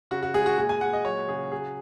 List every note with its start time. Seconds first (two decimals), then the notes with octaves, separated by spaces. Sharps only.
0.11 C#3 F#4
0.23 F#4
0.34 G#3 G#4
0.46 F#4
0.58 A#2 G#4
0.69 G#5
0.81 G#3 F#5
0.93 D#5
1.05 F#3 C#5
1.28 C#3 G#4
1.52 F#3 G#4